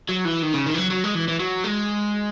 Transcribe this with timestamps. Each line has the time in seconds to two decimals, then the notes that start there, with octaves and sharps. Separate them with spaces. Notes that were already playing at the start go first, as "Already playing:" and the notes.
0.09 F#3
0.25 E3
0.42 D#3
0.54 C#3
0.66 D#3
0.74 E3
0.78 F#3
0.91 F#3
1.04 G#3
1.15 E3
1.28 E3
1.40 F#3
1.64 G#3